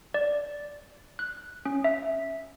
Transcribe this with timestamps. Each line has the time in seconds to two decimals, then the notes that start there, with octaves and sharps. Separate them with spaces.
0.14 D5
1.19 F#6
1.65 C#4
1.84 E5